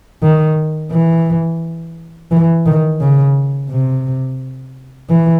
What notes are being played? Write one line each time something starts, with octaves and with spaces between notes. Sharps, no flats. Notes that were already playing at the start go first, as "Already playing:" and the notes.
D#3
E3
E3
D#3
C#3
C3
E3